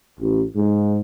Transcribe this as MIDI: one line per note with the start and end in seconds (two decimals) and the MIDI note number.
0.19 0.41 33
0.55 1.00 44